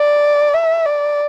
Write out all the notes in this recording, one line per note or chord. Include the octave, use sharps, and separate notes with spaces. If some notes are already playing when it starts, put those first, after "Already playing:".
Already playing: D5
E5
D5